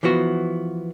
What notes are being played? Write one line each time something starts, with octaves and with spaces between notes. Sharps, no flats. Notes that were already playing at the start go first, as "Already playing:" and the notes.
E3 F3 B3 F#4